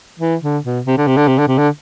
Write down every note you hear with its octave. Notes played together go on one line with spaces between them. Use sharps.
E3
D3
B2
C3
D3
C3
D3
C3
D3
C3
D3